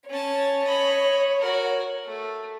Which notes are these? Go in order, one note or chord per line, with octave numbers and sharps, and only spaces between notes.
C#4 C#5 A5
D#5 B5
F#4 A#4
A3